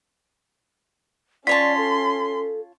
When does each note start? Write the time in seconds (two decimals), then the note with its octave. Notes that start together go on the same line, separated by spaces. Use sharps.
1.47 C#4 F4 C#5 D5 A5 C6 B6
1.78 A4